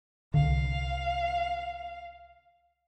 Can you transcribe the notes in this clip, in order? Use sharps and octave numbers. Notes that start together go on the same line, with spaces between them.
C2 D3 F5